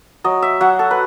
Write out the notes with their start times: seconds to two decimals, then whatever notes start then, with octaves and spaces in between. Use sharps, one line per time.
0.24 F#3 D#5
0.42 E5
0.61 F#3 F#5
0.79 A4
0.91 B4